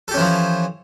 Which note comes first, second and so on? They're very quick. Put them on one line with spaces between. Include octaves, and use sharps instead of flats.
A4 G4 C#4 E3 F3